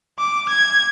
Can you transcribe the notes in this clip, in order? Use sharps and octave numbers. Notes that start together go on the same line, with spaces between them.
D6
G#6